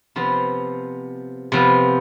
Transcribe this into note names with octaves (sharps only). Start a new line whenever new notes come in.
C3 F3 B3 F4
C3 F3 B3 F4